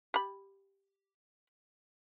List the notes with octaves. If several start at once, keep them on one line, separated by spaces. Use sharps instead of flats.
G4 B5